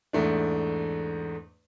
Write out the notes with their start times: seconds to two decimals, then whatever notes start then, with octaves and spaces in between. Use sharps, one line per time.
0.13 E2 G#2 A3 D4